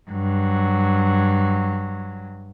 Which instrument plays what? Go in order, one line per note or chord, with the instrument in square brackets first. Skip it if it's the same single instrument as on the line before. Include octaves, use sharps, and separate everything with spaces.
[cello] G2 F#3